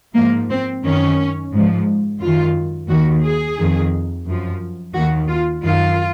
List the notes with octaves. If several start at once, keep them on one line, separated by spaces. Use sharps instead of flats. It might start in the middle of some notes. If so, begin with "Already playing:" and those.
G#2 F3 A#3
C4
F#2 D#3 C#4
G#2 F3
F#2 D#3 F4
D#2 D#3 F#4
G#4
F2 D#3
F#2 F3
D#2 D#3 F#4
F4
F#2 D#3 F4